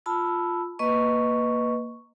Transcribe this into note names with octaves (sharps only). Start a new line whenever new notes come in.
F4 A5 B5 E6
A#3 B4 D#5 C#6